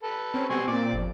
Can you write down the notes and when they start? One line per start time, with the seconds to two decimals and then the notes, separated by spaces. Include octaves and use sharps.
0.03 A4 B4
0.34 C4 C#4
0.49 B2 G3 C4 G#5 C6 C#6
0.68 A#2 C4 D5 D6
0.93 G1 F2